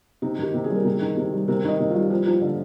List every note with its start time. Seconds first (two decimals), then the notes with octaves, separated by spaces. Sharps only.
0.22 C3 D#4
0.38 D#3 G4
0.54 C3
0.64 G#4
0.70 G3
0.75 A#4
0.85 C3 G#4
1.01 D#3
1.17 C3
1.33 G3
1.48 C3 A#4
1.64 D#3 D#5
1.79 C3
1.90 G3 F4
2.10 F3
2.27 F3
2.41 D3